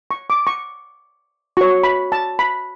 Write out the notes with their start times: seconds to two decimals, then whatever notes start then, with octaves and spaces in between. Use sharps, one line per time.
0.11 C#6
0.30 D6
0.47 C#6
1.57 F#4 C#5 C#6
1.83 B5
2.12 A5
2.39 B5